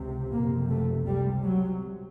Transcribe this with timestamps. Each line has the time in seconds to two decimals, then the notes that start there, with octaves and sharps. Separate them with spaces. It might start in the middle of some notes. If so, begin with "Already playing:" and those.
Already playing: C#2 C3
0.32 F#1 F2 C3 A#3
0.70 A3
1.07 C#2 C3 G3
1.44 F#3